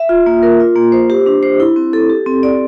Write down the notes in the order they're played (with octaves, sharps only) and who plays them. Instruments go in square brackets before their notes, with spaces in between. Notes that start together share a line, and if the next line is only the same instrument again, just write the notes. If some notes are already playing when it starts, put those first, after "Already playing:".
Already playing: [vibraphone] E5
F4
A#3
A#4
F4
A#3
C5
G4
D4
C5
E4
C4
A4
G4
C4
D5